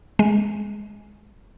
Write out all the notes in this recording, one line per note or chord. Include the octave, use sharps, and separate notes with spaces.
G#3